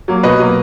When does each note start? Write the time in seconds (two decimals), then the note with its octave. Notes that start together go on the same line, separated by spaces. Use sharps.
0.08 F#3 A#3
0.23 B2 B4 D#5
0.40 F#3 A#3